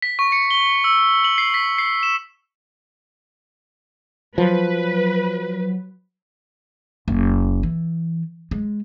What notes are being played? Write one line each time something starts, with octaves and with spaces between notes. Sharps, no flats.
B6
C#6
C#7
G7
E6
F#7
C7
B6
C7
E7
F3 F#3 B4
F#1
E3
G#3